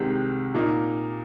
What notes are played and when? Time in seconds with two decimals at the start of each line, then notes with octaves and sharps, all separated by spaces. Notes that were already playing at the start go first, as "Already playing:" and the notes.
Already playing: C2 C3 D#3 G#3 C4
0.54 A#2 A#3 D#4